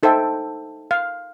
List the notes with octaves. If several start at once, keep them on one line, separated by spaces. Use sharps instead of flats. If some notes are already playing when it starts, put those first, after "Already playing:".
D#4 A4 C5 E5 G5
F5